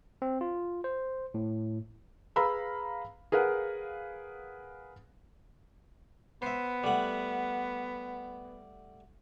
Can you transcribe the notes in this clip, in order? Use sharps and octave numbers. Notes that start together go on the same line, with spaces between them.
C4
F4
C5
A2
G#4 B4 F5 A#5 B5 E6
G#4 A#4 B4 F5 F#5
B3 C5 E5
G3 A3 F#5